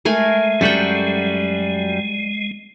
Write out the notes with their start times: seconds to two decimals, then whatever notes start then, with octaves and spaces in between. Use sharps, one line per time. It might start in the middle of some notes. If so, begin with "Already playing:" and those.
0.05 G#3 A3 A#4 G#5
0.61 F#2 G3 F#4 A4 G5